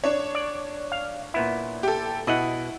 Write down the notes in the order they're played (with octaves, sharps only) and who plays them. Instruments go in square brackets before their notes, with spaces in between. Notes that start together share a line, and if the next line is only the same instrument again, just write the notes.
[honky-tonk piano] D4 C#5
[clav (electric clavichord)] D5
F5
A#2 B3 E4
[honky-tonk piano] G4 A4
[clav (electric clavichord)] B2 D#5 F#5 [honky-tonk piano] E4